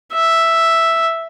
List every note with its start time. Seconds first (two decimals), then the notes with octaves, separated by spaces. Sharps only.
0.14 E5